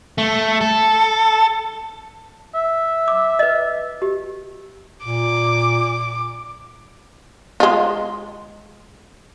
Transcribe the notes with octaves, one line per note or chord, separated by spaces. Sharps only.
A3
A4
E5
D6
B4 D#5
G4
A#2 D6
G#3 F4